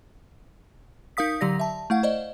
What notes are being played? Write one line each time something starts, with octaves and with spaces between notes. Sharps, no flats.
D#4 A#4 F5 D#6 B6
D3 F#3 G4 D5 A#6
E5 A5
A3 E4 F5 F#5
C5 D5 D#5